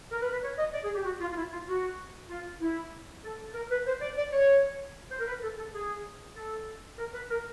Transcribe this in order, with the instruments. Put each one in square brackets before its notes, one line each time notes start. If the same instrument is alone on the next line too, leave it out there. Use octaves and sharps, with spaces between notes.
[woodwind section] A#4
B4
B4
C#5
D#5
D5
G#4
G4
F#4
F4
F4
E4
F4
F#4
F4
E4
A4
A#4
B4
C5
D5
D5
C#5
C5
A#4
B4
A4
A4
G#4
A4
A#4
B4
A#4